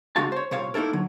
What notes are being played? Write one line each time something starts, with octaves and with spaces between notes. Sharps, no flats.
C#3 G#3 D4 F#4 F5 A5
C5 C#5
C2 A#2 C5 C#5 F5
A#3 D#4 E4 A4 A#4
D3 F#3